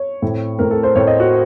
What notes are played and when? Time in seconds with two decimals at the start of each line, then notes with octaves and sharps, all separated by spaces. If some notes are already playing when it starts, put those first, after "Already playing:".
Already playing: C#5
0.22 A2 A3 C4
0.58 A2 A3 C4 A#4
0.71 A4
0.83 C5
0.95 A2 A3 C4 C#5
1.07 D#5
1.20 F#4